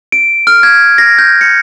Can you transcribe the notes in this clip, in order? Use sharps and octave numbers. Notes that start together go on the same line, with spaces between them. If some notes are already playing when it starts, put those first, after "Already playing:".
D7
F6
G#6
A#6
G6
C#7